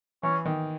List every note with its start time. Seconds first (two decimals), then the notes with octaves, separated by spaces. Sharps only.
0.23 E3 C#4
0.45 D#3